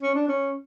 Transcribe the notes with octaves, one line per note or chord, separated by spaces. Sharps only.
C#4
D4
C#4